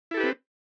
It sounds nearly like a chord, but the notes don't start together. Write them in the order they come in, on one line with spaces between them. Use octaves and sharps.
E4 A4 G4 B4 C4